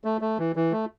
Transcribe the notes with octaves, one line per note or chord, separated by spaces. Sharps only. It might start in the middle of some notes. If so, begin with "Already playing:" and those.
A3
A3
E3
E3
A3